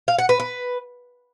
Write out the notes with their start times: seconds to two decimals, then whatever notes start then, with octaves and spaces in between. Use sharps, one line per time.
0.08 F5
0.18 F#5
0.29 B4
0.40 B4